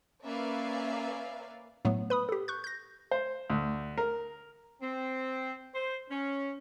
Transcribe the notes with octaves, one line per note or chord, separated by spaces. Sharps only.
A#3 C#4 B4 D5 E5 F5
A2 F#3 A3 B3
B4 B5 D#6
G4 A4
C#6 F#6 G6
G6 A#6
C5
D2
A#4
C4
C5
C#4